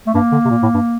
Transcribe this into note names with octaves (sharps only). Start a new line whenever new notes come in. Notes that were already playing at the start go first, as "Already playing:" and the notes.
A3
G2 A#3
D3
C3
A#2
A2
G2